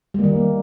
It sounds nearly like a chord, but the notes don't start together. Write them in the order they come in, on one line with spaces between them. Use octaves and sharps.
G3 A#3 D#3